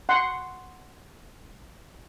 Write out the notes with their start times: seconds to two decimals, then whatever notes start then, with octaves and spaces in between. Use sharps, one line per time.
0.09 F#5 C6